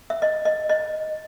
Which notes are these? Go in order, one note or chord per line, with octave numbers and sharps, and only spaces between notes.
E5
D#5
D#5
D#5